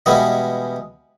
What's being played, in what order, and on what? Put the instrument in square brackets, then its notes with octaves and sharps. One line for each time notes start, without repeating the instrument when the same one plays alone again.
[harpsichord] B2 E3 G3 G#3 B3